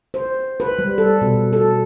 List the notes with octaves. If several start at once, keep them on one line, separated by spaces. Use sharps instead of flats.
C5
B4
G3
A4
B2
A4